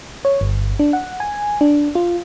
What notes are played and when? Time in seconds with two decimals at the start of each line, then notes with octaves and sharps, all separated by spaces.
0.25 C#5
0.41 G1
0.79 D4
0.93 F#5
1.20 G#5
1.61 D4
1.95 F4